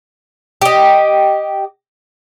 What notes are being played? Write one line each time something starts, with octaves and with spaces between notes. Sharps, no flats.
G4 D#5